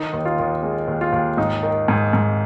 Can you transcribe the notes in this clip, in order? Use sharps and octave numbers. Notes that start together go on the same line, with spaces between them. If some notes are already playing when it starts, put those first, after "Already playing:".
Already playing: D#3 D#4
D#2
F4
D#2
G#3
D#2
F4
D#2
G#2 D#4
D#3
G#2
G#2